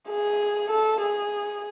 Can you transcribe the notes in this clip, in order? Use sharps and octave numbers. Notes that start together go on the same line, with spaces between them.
G#4
A4
G#4